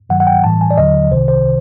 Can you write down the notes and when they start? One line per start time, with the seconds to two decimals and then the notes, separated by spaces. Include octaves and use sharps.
0.10 G2 D#3 F#3 F#5
0.20 F#5
0.27 G5
0.44 A2 E3 G3 A5
0.61 G#5
0.71 D5
0.77 D#2 D3 F#3 D#5
1.11 C2 C3 D#3 C5
1.28 C5